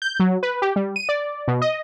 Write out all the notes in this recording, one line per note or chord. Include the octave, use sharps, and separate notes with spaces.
G6
F#3
B4
G4
G3
D#7
D5
B2
D#5